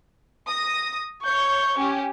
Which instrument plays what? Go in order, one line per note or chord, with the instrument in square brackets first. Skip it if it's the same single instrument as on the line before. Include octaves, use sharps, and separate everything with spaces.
[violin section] D#6 A#6
[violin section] C#5 G6 [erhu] C#6
[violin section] C#4 G4